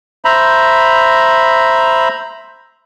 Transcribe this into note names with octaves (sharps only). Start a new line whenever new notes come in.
C5 E5 A#5 B5